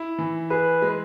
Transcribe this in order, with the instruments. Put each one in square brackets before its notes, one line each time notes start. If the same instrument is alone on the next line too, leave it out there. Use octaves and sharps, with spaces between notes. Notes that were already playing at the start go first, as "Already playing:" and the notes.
Already playing: [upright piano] E4
E3
[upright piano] G#4 [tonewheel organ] B4
[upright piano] G#3